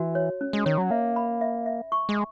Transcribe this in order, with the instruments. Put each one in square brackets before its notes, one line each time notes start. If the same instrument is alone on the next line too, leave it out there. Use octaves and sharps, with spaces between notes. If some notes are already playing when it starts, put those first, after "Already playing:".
Already playing: [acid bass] E3 [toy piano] F#4
[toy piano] C#5
C#4
[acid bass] G#3
[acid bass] D#3 [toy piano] C#5
[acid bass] F#3
[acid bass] A#3 [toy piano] E5
[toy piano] B5
E5
E5
C#6
[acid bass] G#3